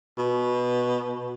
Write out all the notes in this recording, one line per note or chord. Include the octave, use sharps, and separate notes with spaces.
B2